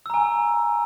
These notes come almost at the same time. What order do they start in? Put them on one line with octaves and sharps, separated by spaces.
E6 A#5 G#5